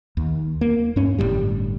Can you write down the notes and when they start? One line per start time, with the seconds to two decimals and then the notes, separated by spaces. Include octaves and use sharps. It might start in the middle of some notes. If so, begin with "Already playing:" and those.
0.17 D#2
0.61 A#3
0.96 G2 C#4
1.18 G1 F2 A2 G3